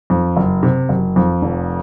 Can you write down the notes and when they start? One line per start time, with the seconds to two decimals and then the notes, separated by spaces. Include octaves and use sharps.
0.10 F2
0.37 F#1
0.63 C3
0.89 F#1
1.16 F2
1.42 F1